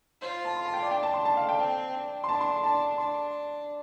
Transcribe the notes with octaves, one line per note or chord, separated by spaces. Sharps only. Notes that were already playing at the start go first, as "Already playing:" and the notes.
F4 C5
A5
C6
A5
G5
D5
D4 G5
A5
C6
A5
F5
G5
C4
D4
C6
D4 A5
C6
D4 A5
D4 C6